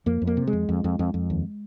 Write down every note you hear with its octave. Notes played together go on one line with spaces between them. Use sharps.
F2 A#3
F2
A#3
C3
G#3
F2
F2
F2
F2
F2
D#2